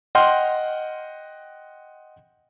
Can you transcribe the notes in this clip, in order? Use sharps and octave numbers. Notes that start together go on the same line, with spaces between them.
D#5 F#5 G5 C6 F6